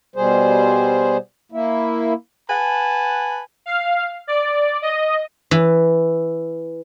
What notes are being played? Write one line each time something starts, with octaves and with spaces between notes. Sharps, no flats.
B2 G3 G#4 C5
A#3 E4
B4 F#5 G#5 A5
F5
D5
D#5
E3